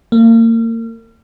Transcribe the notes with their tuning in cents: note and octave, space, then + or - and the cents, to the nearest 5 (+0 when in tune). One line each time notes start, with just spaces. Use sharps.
A#3 -35